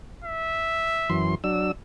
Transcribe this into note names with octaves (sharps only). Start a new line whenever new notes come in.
E5
F#2 E3 C6
F#3 D4 E6